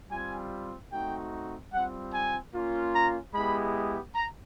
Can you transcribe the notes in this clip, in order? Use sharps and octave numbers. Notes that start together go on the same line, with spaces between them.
G3 C4 F4 G#5
A3 C4 D#4 F#4 G5
G3 C4 F4 F#5
G#5
A#3 C#4 F4
A#5
G#3 B3 E4 G4 B5
A#5